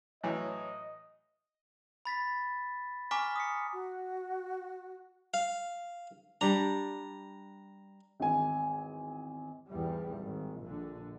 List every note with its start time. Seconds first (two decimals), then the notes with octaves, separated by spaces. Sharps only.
0.24 A2 E3 F#3 D#5
2.05 B5 A6 B6
3.11 G#5 A#5 C#6 D6 F6 B6
3.36 D#6 B6 C#7
3.73 F#4
5.34 F5
6.41 G3 D4 A#5
8.20 G#1 E2 G#5
9.68 E2 G#2 G3
10.19 G#1
10.61 A#1 D3